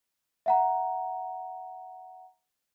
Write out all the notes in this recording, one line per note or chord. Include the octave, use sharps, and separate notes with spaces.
E5 F#5 A#5